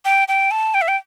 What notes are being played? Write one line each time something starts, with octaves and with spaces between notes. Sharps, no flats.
G5
G5
A5
G5
E5
G5